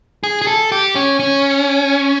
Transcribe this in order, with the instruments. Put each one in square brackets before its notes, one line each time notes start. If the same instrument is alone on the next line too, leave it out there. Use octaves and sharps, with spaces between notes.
[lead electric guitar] G#4
G#4
A4
G4
C#4
C#4